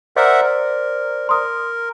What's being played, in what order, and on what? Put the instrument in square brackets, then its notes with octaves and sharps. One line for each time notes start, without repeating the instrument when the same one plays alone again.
[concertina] A#4 E5 F#5 [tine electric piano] C5 D5
[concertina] A#4
[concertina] A#4 [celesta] C6 D#6